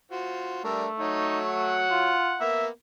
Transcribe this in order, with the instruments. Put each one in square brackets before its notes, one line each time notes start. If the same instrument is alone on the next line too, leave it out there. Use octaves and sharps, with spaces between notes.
[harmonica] F4 F#4 C5
[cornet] G3 [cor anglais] A3 [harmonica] D4 A#4 E5
[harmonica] F#3 F#4 C#5 [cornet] D#4
[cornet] F#5
[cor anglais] F4
[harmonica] A#3 B3 A#4 [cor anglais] E5